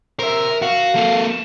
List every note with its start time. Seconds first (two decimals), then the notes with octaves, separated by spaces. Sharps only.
0.19 A#4 C5 E5
0.62 F#4 F5
0.95 A#3 A4